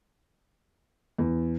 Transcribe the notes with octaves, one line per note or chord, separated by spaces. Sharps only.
E2